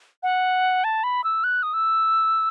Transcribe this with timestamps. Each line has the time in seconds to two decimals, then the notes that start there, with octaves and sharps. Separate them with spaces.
0.23 F#5
0.84 A5
1.04 B5
1.24 E6
1.44 F#6
1.63 D#6
1.74 E6